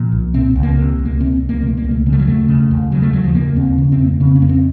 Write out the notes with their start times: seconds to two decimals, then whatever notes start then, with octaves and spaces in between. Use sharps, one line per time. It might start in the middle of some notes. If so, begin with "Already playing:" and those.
Already playing: A#2 F3
0.12 C2
0.34 C3 C4
0.56 C#2
0.63 A#3
0.77 C3
0.99 C#2
1.05 A#3
1.20 C3 C4
1.42 C#2
1.49 A#3
1.63 C3 A3
1.77 A#3
1.84 C#2
1.91 A3
2.06 C#3 A#3
2.13 A3
2.20 F#3
2.27 D#2 A3
2.48 C#3
2.71 D#2
2.91 C#3 F#3
3.02 A3
3.13 D#2 F#3
3.24 F3
3.35 C#3 A#3
3.56 D#2 C4
3.78 C#3 C#4
3.92 C4
3.99 F2
4.06 A#3
4.20 C#3 C4
4.35 C#4
4.42 F2 A#3
4.49 C4